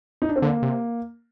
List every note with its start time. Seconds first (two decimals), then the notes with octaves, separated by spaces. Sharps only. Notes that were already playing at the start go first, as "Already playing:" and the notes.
0.22 D#4
0.29 D4
0.36 C4
0.42 D3 A#3
0.63 C3